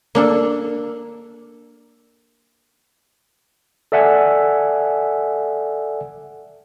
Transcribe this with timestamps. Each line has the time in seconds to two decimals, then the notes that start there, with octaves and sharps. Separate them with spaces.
0.15 A#3 D4 A4
3.92 A4 D5 E5 F#5 G#5